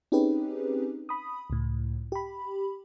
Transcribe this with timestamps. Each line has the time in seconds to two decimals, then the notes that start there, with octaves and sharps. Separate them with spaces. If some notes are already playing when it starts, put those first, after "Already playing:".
0.12 C4 C#4 D#4 G4 G#4 B4
1.09 B5 D#6
1.50 C#2 A2
2.12 G4 B5